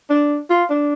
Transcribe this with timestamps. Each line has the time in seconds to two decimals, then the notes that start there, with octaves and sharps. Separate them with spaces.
0.10 D4
0.50 F4
0.70 D4